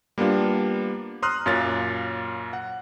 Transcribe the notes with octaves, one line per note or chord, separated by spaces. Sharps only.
G3 A#3 B3 D4 F4
A#5 C6 D#6 F6 F#6
F#2 A#2 F4 A#4 C#5 A6
F#5